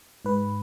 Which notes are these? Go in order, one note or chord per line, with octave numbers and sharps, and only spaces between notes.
G#2 B4